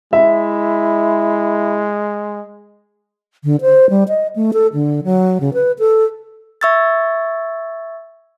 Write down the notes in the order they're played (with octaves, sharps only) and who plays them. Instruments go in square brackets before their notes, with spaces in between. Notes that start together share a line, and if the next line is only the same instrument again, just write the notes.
[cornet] G#3 [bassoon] E4 [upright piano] E5
[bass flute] D3
C5
G3
D#5
A3
A4
D3
F#3
C#3
B4
A4
[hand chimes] E5 C#6 E6 G#6 A6